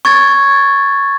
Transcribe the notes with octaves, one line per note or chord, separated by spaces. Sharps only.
C#6 G#6 A6